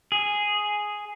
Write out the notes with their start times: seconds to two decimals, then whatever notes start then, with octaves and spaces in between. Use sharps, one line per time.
0.12 G#4